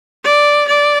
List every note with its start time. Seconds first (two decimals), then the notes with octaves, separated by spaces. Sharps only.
0.24 D5
0.68 D5